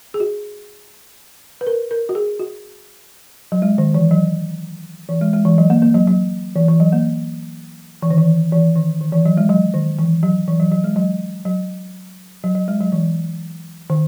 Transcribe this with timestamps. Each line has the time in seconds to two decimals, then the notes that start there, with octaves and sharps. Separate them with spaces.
0.14 G#4
0.20 F#4
1.61 B4
1.67 A#4
1.91 A#4
2.09 F#4
2.15 G#4
2.40 F#4
3.52 F#3
3.62 G#3
3.78 D#3
3.94 E3
4.11 F#3
5.09 E3
5.21 G#3
5.34 G#3
5.45 E3
5.58 F#3
5.70 A#3
5.82 A#3
5.95 F#3
6.07 F#3
6.56 E3
6.68 E3
6.80 F#3
6.93 A#3
8.02 E3
8.10 D#3
8.18 E3
8.52 E3
8.76 D#3
9.01 D#3
9.12 E3
9.26 F#3
9.37 G#3
9.49 F#3
9.74 D#3
9.99 E3
10.23 F#3
10.48 E3
10.60 F#3
10.72 F#3
10.84 G#3
10.96 F#3
11.45 F#3
12.44 F#3
12.55 F#3
12.68 G#3
12.80 F#3
12.92 E3
13.90 D#3